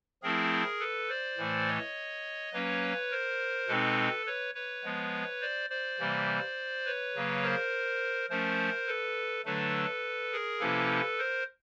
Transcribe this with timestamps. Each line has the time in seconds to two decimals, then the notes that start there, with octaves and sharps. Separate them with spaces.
0.22 F3 A3 C4 E4 G#4 A#4
0.80 A4 B4
1.09 C5 D5
1.38 A2 E3 A3
1.67 C#5 D#5
2.53 F#3 A#3 C#4 B4 C#5
3.11 A#4 C5
3.68 B2 G#3 C4 D#4 A4 B4
4.26 B4 C#5
4.55 B4 C#5
4.84 F3 G#3 B3
5.41 C5 D5
5.70 C5 D5
5.99 C3 E3 G3 A#3
6.86 B4 C#5
7.15 C#3 F#3 A#3
7.43 A#4 C5
8.30 F3 A3 C#4 A#4 C5
8.87 A4 B4
9.45 D3 F#3 A3 D4 A4 B4
10.32 G#4 A#4
10.60 C3 F3 A#3 C#4 E4 A4 B4
11.18 A#4 C5